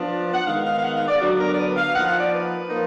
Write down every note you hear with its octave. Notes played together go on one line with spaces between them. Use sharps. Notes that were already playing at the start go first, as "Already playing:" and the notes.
Already playing: F3 B3 D4
F#5
D#3 G#3 B3 D#4 F5
F5
F5
F#5
F5
D5
D3 F#3 B3 D4 F#4
A#4
D5
B4
F5
F3 A#3 D#4 F#5
F5
D5
B4
F3 A#3 D#4